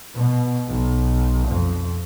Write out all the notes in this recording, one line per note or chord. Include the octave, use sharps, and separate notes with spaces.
B2
B1
F2